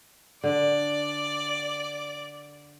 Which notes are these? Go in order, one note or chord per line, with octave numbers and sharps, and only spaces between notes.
D3 D5